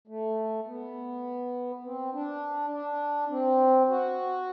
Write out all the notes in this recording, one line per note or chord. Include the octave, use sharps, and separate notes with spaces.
A3
B3
C4
D4
D4
C4
F#4